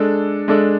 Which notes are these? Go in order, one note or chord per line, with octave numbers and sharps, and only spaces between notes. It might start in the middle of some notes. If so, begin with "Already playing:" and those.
Already playing: G#3 D4 A4
G#3 D4 A4